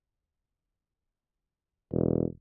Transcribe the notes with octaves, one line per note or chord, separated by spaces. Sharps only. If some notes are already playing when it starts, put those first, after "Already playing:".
E1